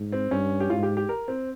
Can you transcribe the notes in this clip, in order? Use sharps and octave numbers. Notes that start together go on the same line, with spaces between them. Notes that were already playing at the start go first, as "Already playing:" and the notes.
Already playing: G#2
C4
G2 C#4
G4
G#2 F4
G4
G4
A#4
C4